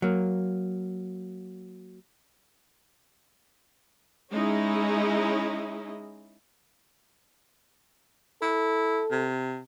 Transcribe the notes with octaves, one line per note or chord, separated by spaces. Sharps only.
F#3 A#3
G#3 C#4 D#4 E4 D#5
E4 A4
C3